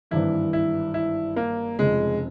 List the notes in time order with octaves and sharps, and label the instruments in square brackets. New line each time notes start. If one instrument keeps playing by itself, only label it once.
[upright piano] G#1 G2 E3 [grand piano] E4
[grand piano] E4
E4
A#3
[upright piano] F1 F2 C#3 [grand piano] G#3